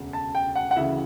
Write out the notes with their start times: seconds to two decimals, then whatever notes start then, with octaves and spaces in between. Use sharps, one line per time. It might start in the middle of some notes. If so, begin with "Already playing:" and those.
Already playing: E1 D2 C#3
0.13 A5
0.35 G5
0.56 F#5
0.71 F#5
0.76 D2 C#3 E3 E5